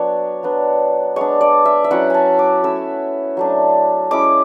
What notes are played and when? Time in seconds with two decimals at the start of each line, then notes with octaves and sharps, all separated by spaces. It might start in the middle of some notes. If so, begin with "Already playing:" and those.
Already playing: F#3 B3 D4 C#5
0.43 F#3 B3 D4
1.16 G#3 B3 D4 C#5
1.41 D5
1.66 E5
1.84 E5
1.91 F#3 C#4 E4 F#5
2.10 G#5 A5
2.39 D6
2.64 A3 C#4 E4 E6
3.37 F#3 A3 D4
4.11 G#3 C#4 E4 D6